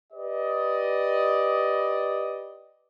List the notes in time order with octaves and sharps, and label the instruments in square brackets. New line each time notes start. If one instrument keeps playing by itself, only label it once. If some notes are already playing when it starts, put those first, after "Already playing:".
[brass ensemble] G4 B4 D5 D#5